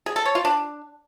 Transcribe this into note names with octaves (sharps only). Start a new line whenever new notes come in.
G#4
A4
C#5
F4
D4